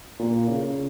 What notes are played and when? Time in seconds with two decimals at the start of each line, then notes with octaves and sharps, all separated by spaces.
0.19 A#2
0.48 C#3